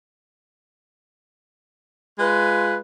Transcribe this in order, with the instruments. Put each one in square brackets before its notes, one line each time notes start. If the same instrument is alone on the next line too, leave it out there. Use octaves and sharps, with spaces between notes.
[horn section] G#3 F4 B4